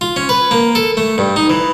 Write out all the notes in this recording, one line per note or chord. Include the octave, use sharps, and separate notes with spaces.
F4
C#4
B4
A#3
A4
A3
G2
D#4
E3